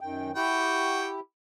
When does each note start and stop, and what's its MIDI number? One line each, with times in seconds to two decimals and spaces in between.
0.01 0.31 42
0.01 0.31 51
0.01 0.31 79
0.36 1.20 64
0.36 1.08 66
0.36 1.20 67
0.36 1.08 79